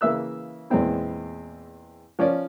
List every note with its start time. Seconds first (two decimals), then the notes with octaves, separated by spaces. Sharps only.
0.01 C#3 E3 A#3 E5 E6 F#6
0.70 E2 A#2 G#3 B3 C4 E4
2.19 F3 C#4 C#5 D5